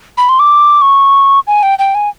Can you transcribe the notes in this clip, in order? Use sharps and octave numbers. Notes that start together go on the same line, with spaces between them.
B5
C6
D6
C#6
G#5
G5
G5
G#5